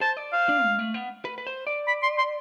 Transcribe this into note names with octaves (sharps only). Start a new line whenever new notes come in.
C5 A5
D5
C5 F5
D4
G#3
A3
B3
B4
B4
C5
D5
B5
C6
C6